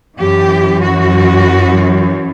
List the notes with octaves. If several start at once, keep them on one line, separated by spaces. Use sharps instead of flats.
F#2 E3 G4
F#4